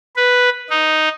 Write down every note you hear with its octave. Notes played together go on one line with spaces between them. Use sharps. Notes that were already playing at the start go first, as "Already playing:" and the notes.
B4
D#4